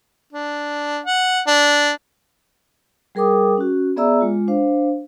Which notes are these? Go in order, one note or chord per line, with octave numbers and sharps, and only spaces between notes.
D4
F#5
D4
G3 G#4 A#4 G5 D6 D#6
C#4 F#4
B3 G#4 D5 E5 A#5 E6
G#3 F4
D4 C5 F5